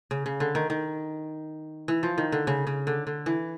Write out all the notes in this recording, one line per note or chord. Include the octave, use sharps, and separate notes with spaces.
C#3
C#3
D3
D#3
D#3
E3
F3
D#3
D3
C#3
C#3
D3
D3
E3